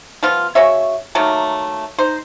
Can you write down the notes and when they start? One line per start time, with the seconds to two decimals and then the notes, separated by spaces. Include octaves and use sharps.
0.23 F3 G3 B3 F4
0.55 C#3 F#4 C#5 E5
1.15 D#3 F#3 A3 A#3
1.99 D#4 C5